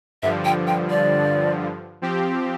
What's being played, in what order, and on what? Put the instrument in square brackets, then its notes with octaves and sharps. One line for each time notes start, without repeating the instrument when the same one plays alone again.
[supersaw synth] G2 D3 F3 [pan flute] E5
[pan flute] G5
G5
D5
[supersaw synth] F3 C4 G4